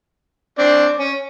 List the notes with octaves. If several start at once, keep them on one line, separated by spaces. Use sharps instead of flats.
C4 D4
C#4